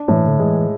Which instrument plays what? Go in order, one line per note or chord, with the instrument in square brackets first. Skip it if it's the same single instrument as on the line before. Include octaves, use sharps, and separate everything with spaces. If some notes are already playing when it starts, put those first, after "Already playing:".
Already playing: [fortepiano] D4
[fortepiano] A2 [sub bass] E3
[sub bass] D3
[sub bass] E3 [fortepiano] G#3